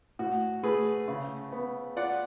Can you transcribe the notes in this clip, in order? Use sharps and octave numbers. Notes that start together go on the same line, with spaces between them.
A2 F#4
A3 G#4 B4
C#3
B3
F4 D5 F#5